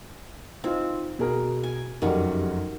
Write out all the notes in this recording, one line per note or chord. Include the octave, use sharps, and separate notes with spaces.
C4 D#4 F4
B2 G#4 A#4
G#5
F1 F#2 D#3 G3 F#5